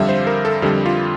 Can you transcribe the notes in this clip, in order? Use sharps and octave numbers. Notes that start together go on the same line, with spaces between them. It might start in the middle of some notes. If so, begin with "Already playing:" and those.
Already playing: F2 D3 G3 E5 F5
C5
A#4
A4
F2 D3 G3 G4
F4